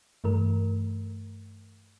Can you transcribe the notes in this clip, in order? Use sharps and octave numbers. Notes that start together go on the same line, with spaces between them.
G2 E3 A3 A#4